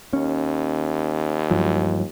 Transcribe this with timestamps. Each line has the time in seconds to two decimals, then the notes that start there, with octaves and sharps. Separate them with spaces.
0.13 D#2 C#4
1.51 G2 F3 F#3